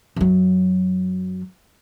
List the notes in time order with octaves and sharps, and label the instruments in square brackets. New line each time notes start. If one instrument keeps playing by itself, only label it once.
[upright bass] F#2 F#3